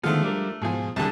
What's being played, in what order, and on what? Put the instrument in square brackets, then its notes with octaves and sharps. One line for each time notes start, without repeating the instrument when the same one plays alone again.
[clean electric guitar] D3 D#3 B3 [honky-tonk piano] F3 G#3 F4 [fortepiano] A3 F5
[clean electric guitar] G3 D4 A#4
[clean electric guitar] G#2 G#4 [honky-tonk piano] B2 F3
[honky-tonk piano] C2 [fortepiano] D3 G#4 A5 [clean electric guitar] G3